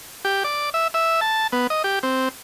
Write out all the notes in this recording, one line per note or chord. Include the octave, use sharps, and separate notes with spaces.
G4
D5
E5
E5
A5
B3
D#5
G4
C4